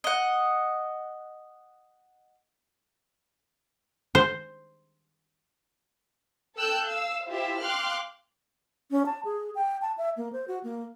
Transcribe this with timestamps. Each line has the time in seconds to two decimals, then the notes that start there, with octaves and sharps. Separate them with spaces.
0.04 D#5 F#5
4.15 C5
6.57 A4 G5 E6 F#6 G6
6.88 F5 E6
7.29 E4 F4 G4 C5 E5
7.62 F5 G5 C6 D6 F6 F#6
8.91 C#4
9.06 A5
9.25 G#4
9.55 G5
9.82 A5
9.98 E5
10.17 A#3
10.33 C5
10.48 F#4
10.64 A#3